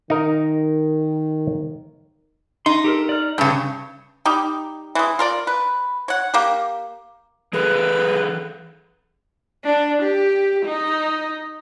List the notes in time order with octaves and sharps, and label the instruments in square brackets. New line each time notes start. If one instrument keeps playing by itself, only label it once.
[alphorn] D#3 [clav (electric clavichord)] D#4 A#4
[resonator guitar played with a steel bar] D#4 [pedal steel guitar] C6
[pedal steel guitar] G4 A4 A#4
D5 F6
[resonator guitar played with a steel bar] G2 C#3 [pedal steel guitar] G6
[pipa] G3 D#4 G4
E3 G#3
F4 A#4 D5
B4
C#5 F#5
A#3 G4
[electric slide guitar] E3 G#4 A4 [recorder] B4
[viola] D4
G4
D#4